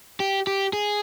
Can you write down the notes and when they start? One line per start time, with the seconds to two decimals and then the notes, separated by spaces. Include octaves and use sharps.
0.20 G4
0.47 G4
0.73 G#4